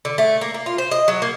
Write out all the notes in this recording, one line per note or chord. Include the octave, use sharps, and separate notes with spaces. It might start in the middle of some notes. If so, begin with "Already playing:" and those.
D3
A3
A#3
A#3
F4
C5
D#5
F#3
A#3